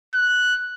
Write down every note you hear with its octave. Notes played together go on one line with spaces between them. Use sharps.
F#6